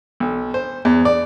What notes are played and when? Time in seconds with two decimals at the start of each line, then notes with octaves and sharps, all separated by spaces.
0.20 B1
0.54 C5
0.85 E2
1.05 D5